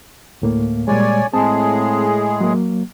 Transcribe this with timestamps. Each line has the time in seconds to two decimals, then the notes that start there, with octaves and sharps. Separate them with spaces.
0.42 D2 A2 A#3
0.88 A#2 G3 G#3 C#5 D5 G#5
1.33 A2 G#3 C4 G#4 A5
2.41 F#3 A#3